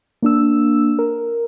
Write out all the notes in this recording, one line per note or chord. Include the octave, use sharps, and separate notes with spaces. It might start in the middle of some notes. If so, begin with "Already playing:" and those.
A#3 D4 E6
A#4